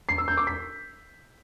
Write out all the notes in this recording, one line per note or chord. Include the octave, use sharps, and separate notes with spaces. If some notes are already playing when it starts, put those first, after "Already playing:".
C7
E6
G6
D6
B6